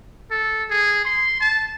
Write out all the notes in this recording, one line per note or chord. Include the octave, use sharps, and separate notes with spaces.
A4
G#4
C6
A5